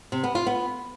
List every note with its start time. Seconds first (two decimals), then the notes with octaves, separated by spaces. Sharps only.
0.12 C3
0.24 B3
0.35 F4
0.46 B3